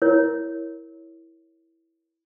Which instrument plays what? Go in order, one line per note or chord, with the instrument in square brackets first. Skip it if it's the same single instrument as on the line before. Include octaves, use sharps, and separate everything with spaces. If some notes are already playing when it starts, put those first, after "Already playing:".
[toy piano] E4 A#4 C#5